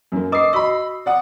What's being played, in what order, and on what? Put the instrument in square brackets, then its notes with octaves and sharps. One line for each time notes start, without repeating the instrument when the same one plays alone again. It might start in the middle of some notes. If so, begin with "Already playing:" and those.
[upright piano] F#2 A#3
[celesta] B4 D#5 D#6 [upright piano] D6 C7
[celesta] F#4 C#6 E6 [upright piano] D#5 B5
[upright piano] D5 F#5 D#6